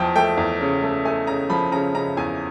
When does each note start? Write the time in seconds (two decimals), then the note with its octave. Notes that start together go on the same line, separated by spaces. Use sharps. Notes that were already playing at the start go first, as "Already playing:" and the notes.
Already playing: E2 F3 G5
0.16 A3 G5
0.37 E2
0.61 C#3
0.83 A3
1.05 A3 G#5
1.27 C#3 A#5
1.50 F3 B5
1.72 C#3 A#5
1.94 C#3 A#5
2.17 E2 G#5